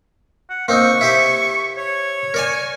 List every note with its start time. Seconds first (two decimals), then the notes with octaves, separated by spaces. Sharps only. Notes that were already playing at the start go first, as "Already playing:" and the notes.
0.50 F#5
0.68 A#3 C4 D#4 C#6
1.01 E4 G4 C5
1.77 C#5
2.34 A#4 D5 G#5